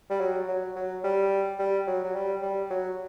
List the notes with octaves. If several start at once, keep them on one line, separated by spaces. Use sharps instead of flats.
G3
F#3
F#3
F#3
G3
G3
F#3
F#3
G3
G3
F#3